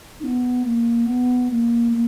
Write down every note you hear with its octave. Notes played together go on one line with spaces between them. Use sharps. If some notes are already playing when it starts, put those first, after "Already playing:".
D#4
B3
A#3
B3
A#3
A#3